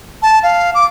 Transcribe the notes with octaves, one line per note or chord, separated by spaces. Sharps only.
A5
F5
D6